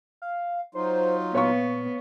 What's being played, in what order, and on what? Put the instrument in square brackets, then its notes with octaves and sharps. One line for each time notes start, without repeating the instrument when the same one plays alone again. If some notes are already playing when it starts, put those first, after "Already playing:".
[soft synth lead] F5
[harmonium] F#3 D#4 F4 [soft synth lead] C5
[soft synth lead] A#2 [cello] B3 [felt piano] C#5 F5 C#6